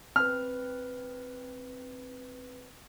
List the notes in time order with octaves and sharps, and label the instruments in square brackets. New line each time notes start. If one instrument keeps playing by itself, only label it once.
[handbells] C4 B4 [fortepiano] F6